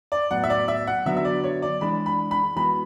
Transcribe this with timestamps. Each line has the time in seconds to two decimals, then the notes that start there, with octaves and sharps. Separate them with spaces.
0.12 D5
0.31 A2 F#3 B3 F#5
0.44 E5
0.50 D5
0.68 E5
0.87 F#5
1.06 D3 F#3 B3 D4 F#4 E5
1.17 E5
1.25 D5
1.44 C#5
1.62 D5
1.81 E3 G#3 D4 B5
2.06 B5
2.31 B5
2.56 E3 G#3 B3 F#4 B5